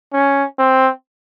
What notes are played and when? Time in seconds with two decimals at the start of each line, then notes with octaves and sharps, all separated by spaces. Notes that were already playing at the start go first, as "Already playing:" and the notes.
0.13 C#4
0.59 C4